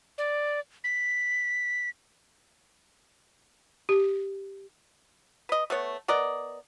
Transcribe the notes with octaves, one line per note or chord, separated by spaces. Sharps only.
D5
B6
G4
B4 D#5
A3 B3 C#5
B3 A#4 D5 D#5